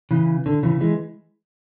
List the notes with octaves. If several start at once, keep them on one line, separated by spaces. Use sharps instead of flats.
C#3 E3
D3
C#3 E3
E3 G#3